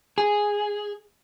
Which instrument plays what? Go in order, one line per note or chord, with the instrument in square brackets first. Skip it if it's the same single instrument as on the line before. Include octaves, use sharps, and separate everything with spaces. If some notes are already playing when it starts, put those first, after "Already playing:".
[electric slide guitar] G#4